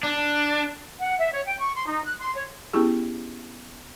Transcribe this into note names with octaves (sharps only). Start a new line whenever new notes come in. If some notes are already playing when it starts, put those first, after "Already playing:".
D4
F#5
E5
C#5
G5
C#6
C6
D#4
F#6
C6
C#5
B3 C#4 E4 G4 G#4